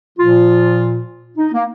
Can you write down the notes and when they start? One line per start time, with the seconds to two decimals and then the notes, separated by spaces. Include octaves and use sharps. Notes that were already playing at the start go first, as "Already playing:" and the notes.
0.17 A#2 F3 F4
1.37 D#4
1.52 A#3